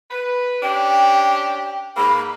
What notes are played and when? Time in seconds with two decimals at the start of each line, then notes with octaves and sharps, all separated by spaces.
0.11 B4
0.63 C#4 D4 G4 G5
1.97 G#2 A#3 B5